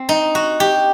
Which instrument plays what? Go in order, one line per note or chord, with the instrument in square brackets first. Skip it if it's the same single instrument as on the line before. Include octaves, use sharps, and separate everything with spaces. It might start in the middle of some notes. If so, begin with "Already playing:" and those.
Already playing: [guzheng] C4
D#4
F#4
G4